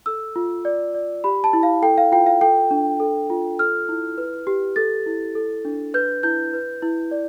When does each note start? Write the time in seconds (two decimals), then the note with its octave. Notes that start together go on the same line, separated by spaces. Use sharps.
0.06 A4 E6
0.36 F4
0.65 D5
0.95 D5
1.24 G4 B5
1.44 A5
1.53 E4
1.63 F5
1.82 A4 G5
1.98 F5
2.12 F4 G5
2.26 F5
2.41 A4 G5
2.71 D4
3.00 A4
3.30 F4
3.59 A4 F6
3.89 E4
4.18 B4
4.47 G4
4.76 A4 A6
5.06 E4
5.35 A4
5.65 D4
5.94 B4 G6
6.23 E4 G6
6.53 B4
6.82 E4
7.11 D5